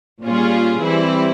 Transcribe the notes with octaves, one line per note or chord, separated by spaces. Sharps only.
A#2 G3 C#4 F4 G#4
E3 G3 C4 E4